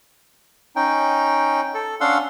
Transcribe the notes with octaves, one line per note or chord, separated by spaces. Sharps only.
C#4 D#4 G5
A4
C#4 D4 F5 F#5 C6 E6